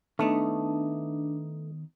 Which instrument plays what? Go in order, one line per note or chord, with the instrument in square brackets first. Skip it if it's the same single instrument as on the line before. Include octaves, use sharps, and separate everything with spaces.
[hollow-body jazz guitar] D#3 B3 D#4 [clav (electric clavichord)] A3 [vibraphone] D4